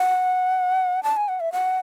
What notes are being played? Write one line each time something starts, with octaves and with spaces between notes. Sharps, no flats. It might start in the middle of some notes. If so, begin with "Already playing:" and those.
Already playing: F#5
A5
G#5
F#5
E5
F#5